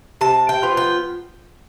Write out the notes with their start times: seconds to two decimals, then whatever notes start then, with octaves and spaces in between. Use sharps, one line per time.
0.21 C3 A5
0.49 G5
0.63 F3 B3 F4
0.77 G5